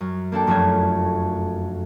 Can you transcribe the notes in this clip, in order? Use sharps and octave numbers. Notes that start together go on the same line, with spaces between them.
F#2
A#3 D4 A4 G5
F1 F#2 A3 F#4 G#6